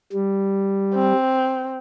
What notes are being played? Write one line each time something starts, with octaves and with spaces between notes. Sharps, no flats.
G3
C4